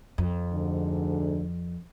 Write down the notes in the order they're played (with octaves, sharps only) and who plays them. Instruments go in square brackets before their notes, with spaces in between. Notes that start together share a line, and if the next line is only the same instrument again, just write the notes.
[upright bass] F2
[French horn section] D2 G#2 D3